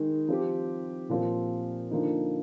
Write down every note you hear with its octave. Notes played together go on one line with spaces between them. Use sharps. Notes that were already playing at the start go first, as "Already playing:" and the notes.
Already playing: D#3 G#3 D#4
F3 C4 G4
A#2 F3 C4
D3 F3 A#3 D#4